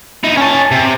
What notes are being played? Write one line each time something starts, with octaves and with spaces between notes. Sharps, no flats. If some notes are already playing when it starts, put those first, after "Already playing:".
D#4 E4
C#4 A5
C3